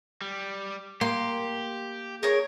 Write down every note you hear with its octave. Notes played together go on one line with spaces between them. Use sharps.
G3
A#3 G4 C6
G#4 A#4 C#5